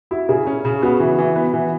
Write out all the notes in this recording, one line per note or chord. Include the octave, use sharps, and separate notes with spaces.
E4 F#4
C#3 G#4
C#4
C#3
B3 F#4
E3
E3
B3
E3